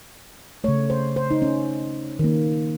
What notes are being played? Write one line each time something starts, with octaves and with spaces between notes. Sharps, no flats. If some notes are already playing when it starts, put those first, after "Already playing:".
C#3 A3 C#5
C5
C5
D#4
C#4
D#3 A#3